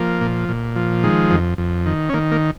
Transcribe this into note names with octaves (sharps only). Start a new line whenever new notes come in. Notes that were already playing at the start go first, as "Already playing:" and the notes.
Already playing: F3 A#3
A#2
A#2
F3
D#3 G#3
F2
F2
D#3
C#4
D#3 A#3
A#3